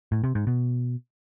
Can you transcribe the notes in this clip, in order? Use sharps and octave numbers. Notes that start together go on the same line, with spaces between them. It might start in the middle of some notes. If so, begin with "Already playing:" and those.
A2
C3
G#2
B2